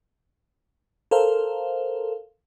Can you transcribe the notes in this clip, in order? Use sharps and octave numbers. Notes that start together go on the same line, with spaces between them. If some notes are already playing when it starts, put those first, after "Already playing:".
A4 A#4 C5 F5